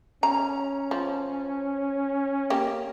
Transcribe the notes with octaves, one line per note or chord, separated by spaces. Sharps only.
C#4 A#5
F3
A#3 G4